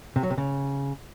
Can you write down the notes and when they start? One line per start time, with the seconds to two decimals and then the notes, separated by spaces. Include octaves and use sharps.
0.16 C3
0.23 F#3
0.30 C3
0.38 C#3